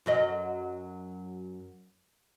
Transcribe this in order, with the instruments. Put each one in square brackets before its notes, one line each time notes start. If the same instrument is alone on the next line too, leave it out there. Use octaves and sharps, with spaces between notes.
[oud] F#2 F#3 D#5